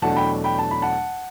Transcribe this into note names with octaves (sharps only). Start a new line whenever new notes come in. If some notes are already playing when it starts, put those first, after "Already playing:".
E2 B2 F#3 A3 D4 F#5 A5
G5 B5
G5 B5
A5
B5
F#5 A5